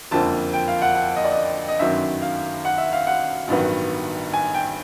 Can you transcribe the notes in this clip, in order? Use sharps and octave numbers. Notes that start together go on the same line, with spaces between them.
F#1 F2 D3 F3 A#3 A5
G5
F5
F#5
F#5
D#5
D5
D#5
D#5
G1 F#2 D#3 F#3 E5
F5
F#5
E5
F5
F#5
A1 G2 D#3 F#3 B3
G#5
G5